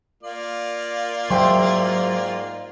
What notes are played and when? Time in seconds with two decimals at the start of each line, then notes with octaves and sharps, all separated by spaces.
0.23 A#3 F4 D5
1.30 G#2 F#3 E5 G5 C6